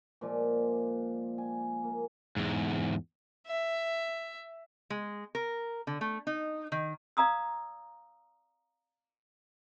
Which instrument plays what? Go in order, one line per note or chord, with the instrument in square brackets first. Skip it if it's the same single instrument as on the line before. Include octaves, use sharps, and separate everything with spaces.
[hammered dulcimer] A#2 F3 G#3 D5
G#5
A#3
[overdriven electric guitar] E2 G#2
[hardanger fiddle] E5
[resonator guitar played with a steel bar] G#3
A#4
D3
A3
D#4
D#3
[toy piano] D5 F5 A#5 D#6 E6